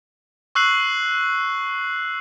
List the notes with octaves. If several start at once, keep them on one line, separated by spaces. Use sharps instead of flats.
C#6 E6 F#6 C7 F#7